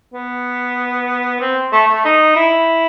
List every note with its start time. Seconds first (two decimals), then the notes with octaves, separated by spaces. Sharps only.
0.14 B3
1.41 C4
1.72 A3
1.88 A3
2.05 D#4
2.36 E4